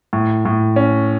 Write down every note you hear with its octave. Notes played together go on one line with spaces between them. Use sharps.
A2
A2
C#4